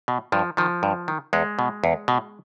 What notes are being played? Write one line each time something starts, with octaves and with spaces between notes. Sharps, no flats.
B2
G2 F3
D#3 F3
G2
D#3
E2 G#3
B2
E2
B2